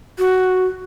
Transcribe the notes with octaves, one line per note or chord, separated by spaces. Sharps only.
F#4